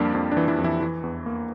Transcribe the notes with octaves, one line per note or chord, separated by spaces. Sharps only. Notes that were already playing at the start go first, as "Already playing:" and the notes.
Already playing: F2 F3 G3 A#3 D4 G4
F2 D4
D4
E3
E3 E4
F2
E3 E4
E3
E2
A#3